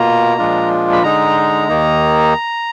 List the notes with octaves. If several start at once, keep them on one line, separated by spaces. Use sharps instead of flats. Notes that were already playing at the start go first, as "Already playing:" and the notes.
Already playing: B2 A#3 F4 A#5
A#2 F3 G#3 D4 F4
B5
D3 G#3 D#4 A#5
D#2 D#3 A#3 D#4